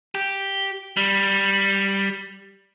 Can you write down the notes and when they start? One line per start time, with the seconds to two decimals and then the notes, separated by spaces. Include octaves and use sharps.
0.15 G4
0.97 G3